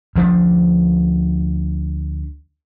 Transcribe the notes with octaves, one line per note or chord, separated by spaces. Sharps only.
D2 F3 D4